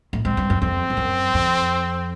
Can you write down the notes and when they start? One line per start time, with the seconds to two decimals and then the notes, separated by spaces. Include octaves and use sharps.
0.13 A2
0.25 G#2 C4
0.37 G2
0.50 F#2
0.62 F2 C4
0.90 F2
0.97 F#2
1.34 F2